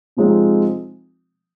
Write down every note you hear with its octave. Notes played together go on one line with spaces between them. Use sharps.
C3 F3 G#3 C4 D#4